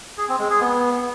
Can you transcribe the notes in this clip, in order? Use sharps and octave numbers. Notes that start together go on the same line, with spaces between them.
G#4
C4
G#3
G#4
B3